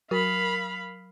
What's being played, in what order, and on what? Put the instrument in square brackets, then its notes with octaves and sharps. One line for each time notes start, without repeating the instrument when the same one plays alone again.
[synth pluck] F#3 [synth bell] A#4 [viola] F5 B5